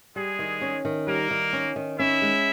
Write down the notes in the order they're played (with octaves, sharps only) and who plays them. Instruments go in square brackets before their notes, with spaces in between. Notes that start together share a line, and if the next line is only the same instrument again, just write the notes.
[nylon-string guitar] G3 [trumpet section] G#3 G#4
[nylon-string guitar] D#3
C#4
D#3
[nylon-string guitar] G3 [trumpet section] A#3 A#4
[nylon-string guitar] D#3
C#4
D#3
[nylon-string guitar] C#4 [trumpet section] E4 E5
[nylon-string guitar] G#3